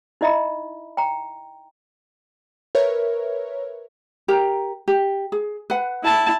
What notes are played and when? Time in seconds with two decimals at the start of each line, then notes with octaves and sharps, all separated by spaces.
0.21 D#4 E4 D#5 E5 A#5 B5
0.97 G5 A#5
2.75 A#4 B4 C#5 E5
4.28 G4 A#4 A#5
4.88 G4
5.32 G#4
5.70 B4 F#5
6.04 E4 A5